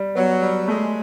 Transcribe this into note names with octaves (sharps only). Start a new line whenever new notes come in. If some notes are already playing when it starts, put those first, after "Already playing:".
Already playing: G3
F#3 B3
G3
G#3 A3